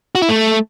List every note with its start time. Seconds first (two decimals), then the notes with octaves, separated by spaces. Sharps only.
0.15 F#4
0.22 E4
0.29 A3